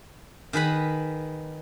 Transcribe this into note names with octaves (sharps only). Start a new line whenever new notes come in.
D#3 G#4 B4 B5